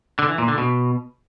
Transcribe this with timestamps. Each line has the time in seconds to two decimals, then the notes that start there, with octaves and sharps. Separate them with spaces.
0.19 D3
0.29 E3
0.38 A#2
0.48 D3
0.58 B2